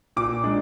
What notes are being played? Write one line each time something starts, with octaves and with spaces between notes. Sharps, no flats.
A#2 D6
G#3 D4